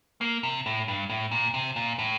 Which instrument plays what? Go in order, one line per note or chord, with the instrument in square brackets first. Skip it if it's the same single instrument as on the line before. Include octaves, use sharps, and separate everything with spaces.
[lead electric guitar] A#3
C3
A2
G2
A2
A#2
C3
A#2
A2